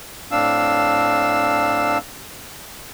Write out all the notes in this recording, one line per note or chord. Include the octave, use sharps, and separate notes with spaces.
A2 C4 D4 F5 E6